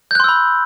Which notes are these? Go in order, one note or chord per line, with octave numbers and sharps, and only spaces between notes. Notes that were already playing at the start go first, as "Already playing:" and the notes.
B5 C6 E6 F#6 G6